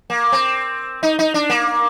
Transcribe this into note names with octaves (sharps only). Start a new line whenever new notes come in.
A#3
C4
D#4
D#4
D4
A#3